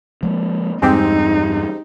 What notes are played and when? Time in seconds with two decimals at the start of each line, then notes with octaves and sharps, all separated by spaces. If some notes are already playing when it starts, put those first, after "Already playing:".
0.23 F3 G#3 A#3
0.82 E2 G2 G#3 C4 D#4 G4